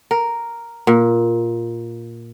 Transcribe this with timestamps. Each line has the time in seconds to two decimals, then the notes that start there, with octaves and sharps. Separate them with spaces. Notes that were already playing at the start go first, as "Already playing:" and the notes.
0.11 A#4
0.87 A#2